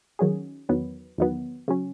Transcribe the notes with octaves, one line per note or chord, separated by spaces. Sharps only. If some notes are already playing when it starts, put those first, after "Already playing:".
D#3 F#3 C#4 G#4
E2 D#3 F#3 B3
E2 D#3 F#3 B3
C#3 F#3 C#4